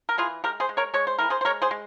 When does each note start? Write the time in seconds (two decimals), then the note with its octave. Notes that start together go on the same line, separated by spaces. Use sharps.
0.09 A#4
0.18 E3 F4 G#4
0.44 G#3 G4 A#4
0.60 G#4 C5
0.69 G#3
0.77 A#4 C#5
0.94 G#3 C#5
1.07 C5
1.19 E3 A#4
1.30 G#4 C5
1.41 C5
1.45 G#3 A#4 C#5
1.62 G#4 C5
1.71 G#3